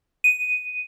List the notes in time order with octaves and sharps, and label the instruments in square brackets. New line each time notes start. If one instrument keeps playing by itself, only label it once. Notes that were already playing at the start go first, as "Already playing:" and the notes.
[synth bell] D#7